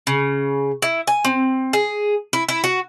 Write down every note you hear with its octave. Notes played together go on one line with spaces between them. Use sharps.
C#3
E4
G#5
C4
G#4
E4
E4
F#4